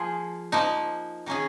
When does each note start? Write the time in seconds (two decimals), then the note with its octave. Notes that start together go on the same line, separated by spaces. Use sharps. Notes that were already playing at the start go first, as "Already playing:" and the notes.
Already playing: F3 A#3 F4 G#4
0.52 F3 A#3 D#4
1.26 D#3 A#3 C#4 G#4